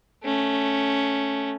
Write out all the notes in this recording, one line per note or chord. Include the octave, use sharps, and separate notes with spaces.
A3 C#4